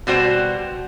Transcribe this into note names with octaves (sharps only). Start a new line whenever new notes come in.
B2 G3 F#4 C5